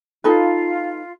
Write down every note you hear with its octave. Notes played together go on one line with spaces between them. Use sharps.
D#4 F4 A4 B4